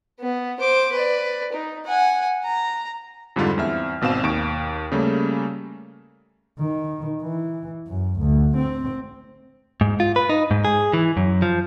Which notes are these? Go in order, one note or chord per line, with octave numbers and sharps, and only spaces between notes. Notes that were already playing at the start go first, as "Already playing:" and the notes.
B3
C5 D6
B4 D5
D#4
F#5 G#5
A#5
F2 G#2 D3 G3 F4
E2 C4 E5 F6
G#1 B2 C4 F5 E7
D#2 C#6 D7
C#3 G3 A3 A#3 C#4
D#3
E3
F#2
D2
C4
G#2
F4
B4
D#4
G#2
G#4
E3
F#2
F3